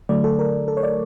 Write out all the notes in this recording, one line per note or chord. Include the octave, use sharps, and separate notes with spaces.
D3 F#3 A3 D5
A4
A#4
A4
C#5
D5